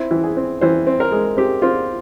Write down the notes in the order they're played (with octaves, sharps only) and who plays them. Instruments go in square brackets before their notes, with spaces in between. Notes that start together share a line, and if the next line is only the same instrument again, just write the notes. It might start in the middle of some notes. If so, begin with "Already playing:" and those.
Already playing: [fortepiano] C4 E4
E3
G#4
C4
E3 C5
C4
A#4
G#3
C4 G4
C4 F4